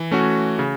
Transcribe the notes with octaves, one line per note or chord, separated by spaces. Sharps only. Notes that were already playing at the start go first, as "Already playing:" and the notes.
Already playing: E3
A3 C#4 F#4
C#3